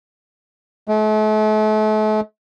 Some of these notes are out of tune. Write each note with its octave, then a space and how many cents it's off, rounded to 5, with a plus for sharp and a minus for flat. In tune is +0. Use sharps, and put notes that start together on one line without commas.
A3 -40